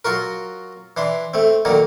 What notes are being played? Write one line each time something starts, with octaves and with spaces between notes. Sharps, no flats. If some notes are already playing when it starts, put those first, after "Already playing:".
F#3 F4 F#4 A#4
E3 D4 C6
A3 C4
D3 D#3 F#3 A#3